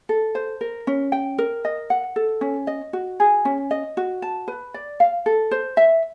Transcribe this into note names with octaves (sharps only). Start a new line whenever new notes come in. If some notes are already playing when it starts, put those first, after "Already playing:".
A4
C5
A#4
C#4
G5
A#4
D#5
F#5
A4
C#4
D#5
F#4
G#4
C#4
D#5
F#4
A5
B4
D5
F5
A4
C5
E5